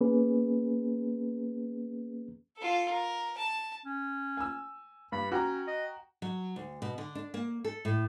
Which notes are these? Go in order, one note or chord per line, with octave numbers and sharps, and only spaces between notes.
A#3 B3 C#4 G#4 B4
F4 A4
A#4
A5
C#4
G#5 E6
G2 B5
C#4 F#4 G5 A#5
D#5
F#3
D2
B2
D3
D4
A#3
A4
A2